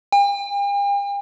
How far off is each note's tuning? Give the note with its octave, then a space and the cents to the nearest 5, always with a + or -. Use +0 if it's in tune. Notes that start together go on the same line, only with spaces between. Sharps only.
G5 +45